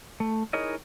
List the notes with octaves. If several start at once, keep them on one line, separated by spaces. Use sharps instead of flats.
A3
D#4 E4 G#4 A#4 C#5 D#5